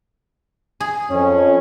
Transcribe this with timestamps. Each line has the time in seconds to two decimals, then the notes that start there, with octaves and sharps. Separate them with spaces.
0.80 G#4
1.11 F2 C#4 C#5